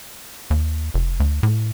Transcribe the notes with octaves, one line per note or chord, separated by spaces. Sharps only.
D#2
F1
D2
A2